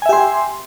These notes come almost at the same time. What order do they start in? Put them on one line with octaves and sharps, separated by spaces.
G#5 E5 G4 C6